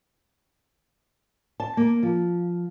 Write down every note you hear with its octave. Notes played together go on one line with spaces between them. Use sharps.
A5
A#3
F3